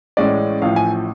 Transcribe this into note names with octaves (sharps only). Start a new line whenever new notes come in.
A1 A2 G#3 C#4 D5
A1 A2 F3 F5
G#5